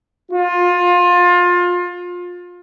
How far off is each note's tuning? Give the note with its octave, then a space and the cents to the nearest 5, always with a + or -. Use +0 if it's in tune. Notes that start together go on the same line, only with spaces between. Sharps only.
F4 +25